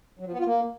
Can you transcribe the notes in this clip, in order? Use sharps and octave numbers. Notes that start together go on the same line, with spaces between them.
F#3
F3
B3
F4
A#3